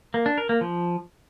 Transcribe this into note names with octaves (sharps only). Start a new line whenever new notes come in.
A#3
D4
A#4
A#3
F3